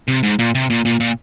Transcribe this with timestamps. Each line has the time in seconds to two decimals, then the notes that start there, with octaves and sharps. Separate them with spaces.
0.09 C3
0.23 G#2
0.39 A#2
0.55 C3
0.70 A#2
0.85 A#2
1.00 A#2